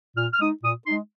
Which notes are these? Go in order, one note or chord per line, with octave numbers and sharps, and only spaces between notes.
A#2 F6
F6
G#3 D#4 D#6
A#2 D#6
G#3 D#4 C6